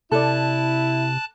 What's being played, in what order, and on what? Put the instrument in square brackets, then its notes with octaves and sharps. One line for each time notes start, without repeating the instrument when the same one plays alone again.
[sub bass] C3 [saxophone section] E4 [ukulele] A4 D5 [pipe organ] A5 F#6